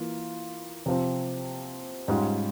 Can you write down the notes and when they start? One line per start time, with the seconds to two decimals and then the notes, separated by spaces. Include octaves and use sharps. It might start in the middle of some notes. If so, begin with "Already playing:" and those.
Already playing: E3 A#3 F4
0.86 C3 F3 C4
2.08 G#2 G3 C#4 F4